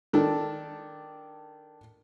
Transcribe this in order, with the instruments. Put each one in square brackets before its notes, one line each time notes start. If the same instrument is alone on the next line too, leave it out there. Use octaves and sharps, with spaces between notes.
[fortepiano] D#3 D4 A4